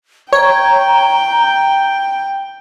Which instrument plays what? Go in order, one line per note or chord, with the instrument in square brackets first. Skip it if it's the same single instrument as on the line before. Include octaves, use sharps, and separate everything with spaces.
[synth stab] C#5 [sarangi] G5 [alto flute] A#5